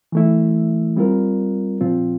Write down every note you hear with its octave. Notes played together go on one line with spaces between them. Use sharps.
E3 A3 E4
G3 C4 F4 A#4
A#2 F3 C4 F4